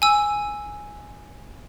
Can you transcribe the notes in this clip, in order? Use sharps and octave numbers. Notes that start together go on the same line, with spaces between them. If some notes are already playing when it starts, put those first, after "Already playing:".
G#5 E6